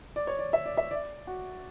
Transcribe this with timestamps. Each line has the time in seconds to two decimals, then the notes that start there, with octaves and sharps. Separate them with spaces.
0.16 D5
0.27 C#5
0.39 D5
0.53 E5
0.66 D5
0.77 E5
0.91 D5
1.27 F#4